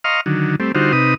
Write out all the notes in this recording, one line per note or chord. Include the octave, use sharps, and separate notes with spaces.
D#5 F5 A#5 C6 C#6 F6
D3 D#3 F#3
G3 A3 C4
D3 G3 D#4 F4 F#4 C5
C3 D#4 B4 D#6